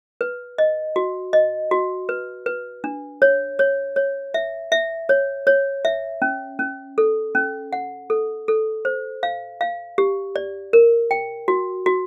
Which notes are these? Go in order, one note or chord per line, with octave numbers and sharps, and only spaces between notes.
B4
D#5
F#4
D#5
F#4
B4
B4
D4
C#5
C#5
C#5
E5
E5
C#5
C#5
E5
C#4
C#4
A4
C#4
F#5
A4
A4
C5
F5
F5
G4
D5
A#4
G5
F#4
F#4